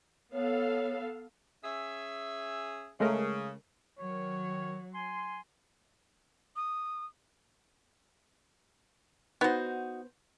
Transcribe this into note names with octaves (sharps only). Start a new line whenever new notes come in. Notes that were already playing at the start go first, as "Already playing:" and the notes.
B3 A4 C#5 F5
C#4 G#4 E5
C#3 G#3 A3 A#4
D#3 F#3 C#5
G#5 C6
D#6
B3 D#4 F#4 C5